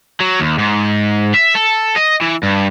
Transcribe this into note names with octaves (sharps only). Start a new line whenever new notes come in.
F#3
D#2
G#2
E5
A4
D#5
E3
G2